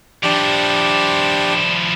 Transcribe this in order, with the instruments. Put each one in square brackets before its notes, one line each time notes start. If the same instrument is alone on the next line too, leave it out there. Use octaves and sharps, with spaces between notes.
[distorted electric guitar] F3 E4 [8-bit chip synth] D4 G4 D5